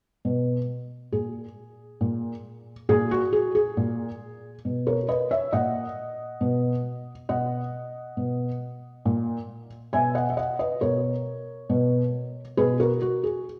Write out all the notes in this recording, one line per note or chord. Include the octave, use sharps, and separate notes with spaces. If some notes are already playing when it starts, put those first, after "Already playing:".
B2
A#2 G#4
A#2
A#2 G#4
F#4
G#4
G#4
A#2
B2
A#4 C#5
B4 D#5
C#5 E5
A#2 D#5 F#5
B2
B2 D#5 F#5
B2
A#2
B2 E5 G#5
D#5 F#5
E5
D#5 F#5
B4 D#5
B2 A#4 C#5
B2
B2 G#4 B4
F#4 A#4
F#4
G#4